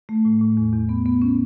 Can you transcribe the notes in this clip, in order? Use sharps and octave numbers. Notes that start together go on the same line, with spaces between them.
A3
A2
A2
E2
E2
B3
B3
C#4